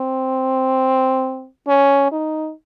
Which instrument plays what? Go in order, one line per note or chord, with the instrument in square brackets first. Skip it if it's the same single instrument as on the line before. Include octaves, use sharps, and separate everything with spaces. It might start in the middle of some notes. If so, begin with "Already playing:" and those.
Already playing: [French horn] C4
C#4
D#4